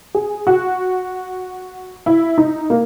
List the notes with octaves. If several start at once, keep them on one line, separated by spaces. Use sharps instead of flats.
G#4
F#4
E4
D#4
A#3